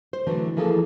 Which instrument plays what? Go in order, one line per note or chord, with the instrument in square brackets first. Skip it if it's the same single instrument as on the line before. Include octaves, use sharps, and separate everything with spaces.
[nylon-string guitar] C5
D3 E3 F#3 A3
E3 F3 A#3 G#4 A4